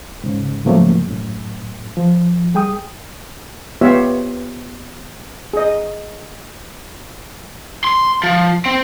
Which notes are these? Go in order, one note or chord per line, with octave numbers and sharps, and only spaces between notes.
G#2 C#3
G#2 C#3 F3 F#3 A3 A#3
F#2 A2
F3
G3 G#4 G5 D#6
B3 F4 G4 C#5 E5 F5
G#4 D#5
C6
F3
C4